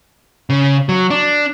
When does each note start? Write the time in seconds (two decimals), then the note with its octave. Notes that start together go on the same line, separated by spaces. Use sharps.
0.50 C#3
0.89 F#3
1.10 D4